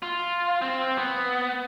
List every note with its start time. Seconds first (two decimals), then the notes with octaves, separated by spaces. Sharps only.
0.03 F4
0.62 C4
0.98 B3